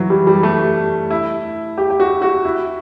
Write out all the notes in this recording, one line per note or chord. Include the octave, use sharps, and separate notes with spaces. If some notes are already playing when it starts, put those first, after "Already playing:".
Already playing: E3 F#3
G3
G3
A3
E4
G4
G4
F#4
F#4
E4